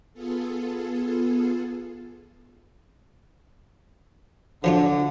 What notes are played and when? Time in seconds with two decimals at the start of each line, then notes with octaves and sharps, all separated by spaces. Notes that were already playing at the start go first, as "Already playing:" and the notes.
0.14 B3 F4 G#4 A4
4.64 D3 F3 F#3 F4